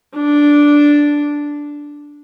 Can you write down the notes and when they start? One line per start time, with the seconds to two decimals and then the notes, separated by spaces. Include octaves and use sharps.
0.17 D4